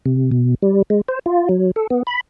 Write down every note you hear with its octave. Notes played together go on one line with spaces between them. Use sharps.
C3
B2
G3
G#3
C5
F4
F#3
A4
B3
B5